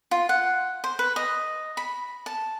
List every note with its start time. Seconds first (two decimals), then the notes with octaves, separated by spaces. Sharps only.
0.11 F4
0.29 F#5
0.84 C5
0.99 B4
1.16 D#5
1.77 B5
2.26 A5